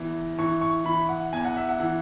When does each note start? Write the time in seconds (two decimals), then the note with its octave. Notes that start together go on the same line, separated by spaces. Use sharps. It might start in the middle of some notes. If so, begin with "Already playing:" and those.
Already playing: E2 E3
0.38 E3 C#6
0.61 C#6
0.85 E3 B5
1.09 F#5
1.32 E2 G#5
1.45 F#5
1.57 E5
1.69 F#5
1.79 E3